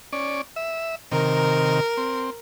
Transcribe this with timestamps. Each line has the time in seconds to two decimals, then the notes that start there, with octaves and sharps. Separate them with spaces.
0.12 C#4 D5
0.56 E5
1.12 C3 D#3 A#4
1.97 C4